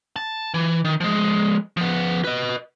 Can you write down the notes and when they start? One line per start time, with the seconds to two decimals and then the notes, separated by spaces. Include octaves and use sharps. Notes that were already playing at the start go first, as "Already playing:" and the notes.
0.16 A5
0.54 E3
0.85 D#3
1.00 F3 G#3
1.77 F3 B3
2.25 B4 D#5